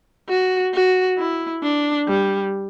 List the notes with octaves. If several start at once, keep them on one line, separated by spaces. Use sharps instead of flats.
F#4
F#4
E4
D4
G3